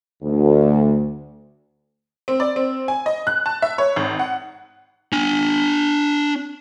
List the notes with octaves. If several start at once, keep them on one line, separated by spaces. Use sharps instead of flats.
D2
C4
D5
C4
G#5
D#5
F#6
A5
E5
C#5
G#1
F#5
D4 G#5